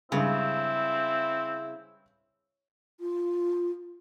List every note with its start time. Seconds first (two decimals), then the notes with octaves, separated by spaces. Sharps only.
0.12 G2 C#3 G#3 C4 E4
3.00 F4